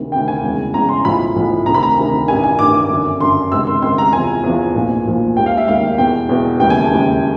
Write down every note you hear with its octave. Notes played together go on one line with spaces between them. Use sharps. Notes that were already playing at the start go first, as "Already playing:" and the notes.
Already playing: D2 C3 D#3
D2 C3 D#3 G5
G#5
E1 E2 C#3
E1 E2 C#3 A#5
C6
B1 A2 F3 B5
B1 A2 F3
D2 C3 D#3 A#5
B5
A#5
D2 C3 D#3
A1 G2 D#3 G#5
G#5
A1 G2 D#3 D6
D6
G1 F#2 D3
G1 F#2 D3 C6
C#2 C3 D#3 E6
C6
C#2 C3 D#3 C6
A#5
E2 C3 F3 G#5
E2 C3 F3
B1 A#2 F3
B1 A#2 F3
E1 D#2 D#3 G5
F5
E5
E1 D#2 D#3 F5
E2 B2 G5
E2 B2
E1 D#2 C#3 E3 G5
G#5
A5
E1 D#2 C#3 E3